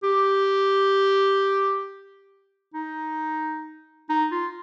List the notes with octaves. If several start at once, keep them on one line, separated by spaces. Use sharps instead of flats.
G4
D#4
D#4
F4